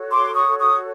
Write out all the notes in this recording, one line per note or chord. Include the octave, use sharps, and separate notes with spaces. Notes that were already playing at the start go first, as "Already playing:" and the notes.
Already playing: F#4 A4 C#5
C6 D6
C#6 D#6
C#6 D#6